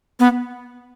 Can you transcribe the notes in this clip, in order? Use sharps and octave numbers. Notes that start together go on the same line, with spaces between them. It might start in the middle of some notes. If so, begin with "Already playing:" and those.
B3